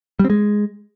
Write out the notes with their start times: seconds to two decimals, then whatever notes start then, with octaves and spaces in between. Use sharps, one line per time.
0.19 G3
0.25 C4
0.30 G#3